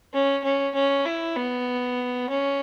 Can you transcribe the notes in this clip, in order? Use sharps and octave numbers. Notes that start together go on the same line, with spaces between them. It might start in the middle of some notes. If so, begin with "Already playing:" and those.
C#4
C#4
C#4
E4
B3
C#4